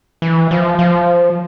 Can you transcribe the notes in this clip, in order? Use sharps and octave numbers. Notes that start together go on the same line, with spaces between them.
E3
F3
F3